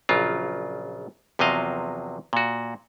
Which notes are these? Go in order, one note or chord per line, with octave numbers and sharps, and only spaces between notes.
A#1 C#3 F#3 F4
E2 C3 F3 F#3 D#5 F5
A#2 F#4